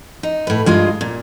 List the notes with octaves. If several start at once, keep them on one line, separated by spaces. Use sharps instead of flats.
D#4
A2 B4
G2 G#3 F4 D#5
A#2